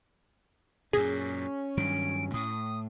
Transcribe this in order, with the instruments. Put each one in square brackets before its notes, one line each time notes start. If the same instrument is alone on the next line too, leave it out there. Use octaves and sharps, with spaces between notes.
[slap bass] F#2 A#2 [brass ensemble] C#4 [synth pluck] G#4
[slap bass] G2 D#3 F#3 [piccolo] D7
[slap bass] A2 [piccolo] D#6